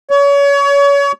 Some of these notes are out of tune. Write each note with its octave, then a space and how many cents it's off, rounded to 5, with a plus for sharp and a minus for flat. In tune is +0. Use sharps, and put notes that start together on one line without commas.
C#5 +30